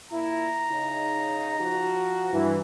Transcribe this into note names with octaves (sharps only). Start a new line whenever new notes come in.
A#2 E4 A#5
C#3 D#4
F3 F#4
G2 E3